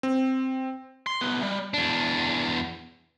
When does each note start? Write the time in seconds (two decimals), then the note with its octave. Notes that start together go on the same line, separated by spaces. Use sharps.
0.03 C4
1.07 C6
1.21 C2 B3
1.43 G3
1.74 E2 D4